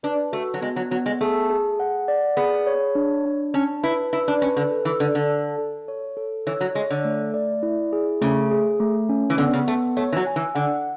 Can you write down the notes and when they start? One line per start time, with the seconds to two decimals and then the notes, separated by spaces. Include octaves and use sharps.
0.03 D4 B4
0.32 A3 F#4
0.54 F#3
0.62 G#3 B3
0.76 F#3
0.91 F#3 B3
1.06 G#3
1.21 A3 G#4
1.50 G#4
1.80 F#5
2.08 D5
2.37 B3 G#4
2.67 C#5
2.95 D4
3.26 D4
3.54 C#4 A5
3.83 E4 B4
4.13 E4 B4
4.28 D4
4.41 C#4 B4
4.57 D3
4.71 A4
4.85 E3
5.00 D3 A4
5.15 D3
5.30 A5
5.58 A4
5.88 C#5
6.17 A4
6.47 E3 C#5
6.61 F#3
6.75 G#3 C#5
6.90 D3
7.05 A3
7.34 D5
7.63 E4
7.93 G#4
8.22 C#3 A3
8.51 G#4
8.80 A3
9.09 C#4
9.30 E3
9.38 D3 B3
9.53 C#3
9.67 A3 B3
9.97 A3 C#5
10.13 E3
10.16 F#3
10.26 G#5
10.36 E3
10.55 D3 F#5